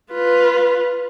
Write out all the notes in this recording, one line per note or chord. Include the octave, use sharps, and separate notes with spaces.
F4 B4